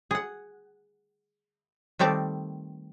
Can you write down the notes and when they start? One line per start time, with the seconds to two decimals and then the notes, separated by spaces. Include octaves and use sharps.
0.11 G#4 F#5
1.99 D#3 G3 A3 C4 D5